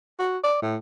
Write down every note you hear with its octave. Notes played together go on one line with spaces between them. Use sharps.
F#4
D5
A2